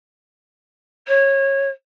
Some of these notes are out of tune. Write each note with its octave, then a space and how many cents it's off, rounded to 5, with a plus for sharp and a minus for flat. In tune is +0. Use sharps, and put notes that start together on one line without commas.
C#5 -20